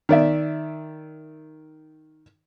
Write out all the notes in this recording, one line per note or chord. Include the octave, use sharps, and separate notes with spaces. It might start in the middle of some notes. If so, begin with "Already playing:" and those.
D#3 D5 E5